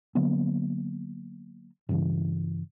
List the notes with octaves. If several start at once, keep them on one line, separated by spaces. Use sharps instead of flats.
D3 F#3 A#3 B3
G2 C#3 E3